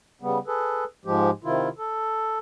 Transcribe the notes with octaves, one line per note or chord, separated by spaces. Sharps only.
C#3 G3 B3
G#4 A4 B4
G#2 F3 G#3 G4
C3 D#3 E4 F4
A4